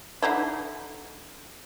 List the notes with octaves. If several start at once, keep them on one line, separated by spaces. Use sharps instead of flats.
D3 D#4 E4